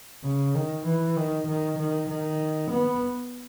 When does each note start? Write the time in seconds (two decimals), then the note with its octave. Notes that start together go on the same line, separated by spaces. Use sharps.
0.24 C#3
0.55 D#3
0.86 E3
1.17 D#3
1.47 D#3
1.78 D#3
2.09 D#3
2.71 B3